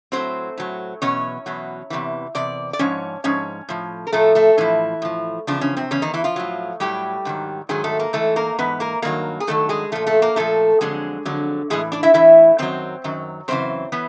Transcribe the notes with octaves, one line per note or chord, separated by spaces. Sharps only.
A2 F#3 C4 C5
A2 F#3
E2 B2 F#3 C#4 C#5
E2 B2 F#3
E2 C3 E3
E2 C3 D5
D5
G#2 F3 C#4 C#5
G#2 F3 C#4 C#5
A2 F3
A#4
A2 F3 A3 A4
A3 A4
A2 E3 F3 E4
A2 F3
E2 C#3 F3 D4
C#3 C#4
C3 C4
E2 C#3 C#4
D#3 D#4
E3 E4
F3 F4
A2 F#3
A2 F#3 G3 G4
G#2 D#3 F#3
G#2 D#3 F#3 G#3 G#4
A3 A4
A#3 A#4
G#2 E3 A3 A4
A#3 A#4
G#2 E3 B3 B4
A#3 A#4
G2 D#3 F#3 A#3 A#4
G#4
G2 D#3 F#3 A3 A4
G#3 G#4
A#2 F3 A3 A4
A3 A4
A#3 A#4
A#2 F3 A3 A4
F2 D3 F#3 G#3 G#4
F2 D3 F#3
A2 E3 G#3 G#4
D4 D5
E4 E5
A2 E3 E4 E5
F#2 D#3 F#3 C4 C5
F#2 D#3 F#3
F#2 C#3 E3 C4 C5
E3 B3